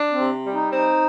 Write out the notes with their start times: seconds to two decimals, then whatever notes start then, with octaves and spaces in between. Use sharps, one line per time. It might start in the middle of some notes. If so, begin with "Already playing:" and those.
Already playing: D4
0.12 C4
0.19 C3
0.47 G3
0.53 D#4
0.73 C4 D#4